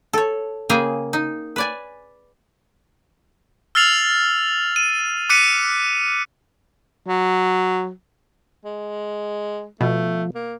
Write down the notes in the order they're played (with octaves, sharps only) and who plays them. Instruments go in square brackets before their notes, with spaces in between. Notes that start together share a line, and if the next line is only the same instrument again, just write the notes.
[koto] A4 C#5
C#3 A#3 G#4 G5 G#5 A#5
D#4
B4 D5 G#5
[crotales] E6 F6 A6 C7 F7 F#7
D#7
D6 F#6 B6 C#7 D#7
[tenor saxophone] F#3
[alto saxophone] G#3
[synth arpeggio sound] B2 [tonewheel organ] F3 [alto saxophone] A3
[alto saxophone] A#3